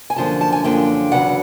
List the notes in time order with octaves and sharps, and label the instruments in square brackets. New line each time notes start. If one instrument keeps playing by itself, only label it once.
[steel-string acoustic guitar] G#5
F#2 D3 F3 A#3 A5
A5
G#5
F#2 D3 F3 A#3 G5
E2 C#3 F#3 F#5